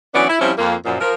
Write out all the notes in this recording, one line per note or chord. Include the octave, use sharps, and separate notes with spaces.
E3 F#3 B3 C#4 D4 D5
E4
F3 G3 C4 C#4 E4
F2 A#3 F4
F#2 A#2 F3
F3 A#4